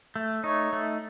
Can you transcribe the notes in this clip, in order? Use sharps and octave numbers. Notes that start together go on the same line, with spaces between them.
A3
D#4 C#5
A3